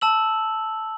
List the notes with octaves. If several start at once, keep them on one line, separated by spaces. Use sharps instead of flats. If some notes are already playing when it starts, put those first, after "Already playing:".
A5 E6 F#7